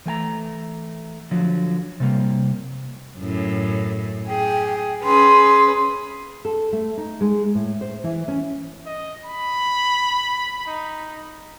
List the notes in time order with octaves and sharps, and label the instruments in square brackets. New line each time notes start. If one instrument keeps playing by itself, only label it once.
[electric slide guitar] E3 A3 G#5 A#5
D3 F3 F#3
C3 G3 A#3
[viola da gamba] F#2 A2
[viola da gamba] G#4 [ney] G5
[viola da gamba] C#4 G#4 B4 [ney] C6
[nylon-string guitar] A4
A3
D#4
G#3
A2
C5
E3
C#4
[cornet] D#5
B5
D#4